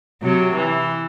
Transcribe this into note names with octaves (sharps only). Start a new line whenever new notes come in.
C3 F#3
E3